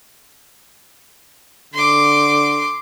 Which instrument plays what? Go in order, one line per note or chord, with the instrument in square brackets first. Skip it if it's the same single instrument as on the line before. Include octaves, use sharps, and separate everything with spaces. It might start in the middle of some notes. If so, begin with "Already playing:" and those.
[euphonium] D3 [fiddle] C6 D6